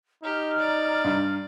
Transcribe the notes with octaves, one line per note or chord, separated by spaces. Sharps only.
D#4 G4 A#5 F6
D5
G2